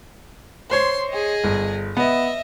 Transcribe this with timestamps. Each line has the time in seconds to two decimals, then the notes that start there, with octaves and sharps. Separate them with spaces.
0.71 C5 C#5 C6
1.10 G#4 D#5
1.44 G1
1.97 B3 D#5 E5